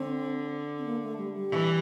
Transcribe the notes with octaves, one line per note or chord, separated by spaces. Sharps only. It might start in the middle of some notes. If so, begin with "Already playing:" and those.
Already playing: D3 C4
C4
A#3
A3
G3
G3
E3